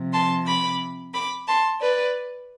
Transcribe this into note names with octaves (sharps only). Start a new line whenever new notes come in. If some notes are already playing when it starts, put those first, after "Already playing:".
Already playing: C3 F3
A5 C6
B5 D6
B5 D6
A5 C6
B4 D5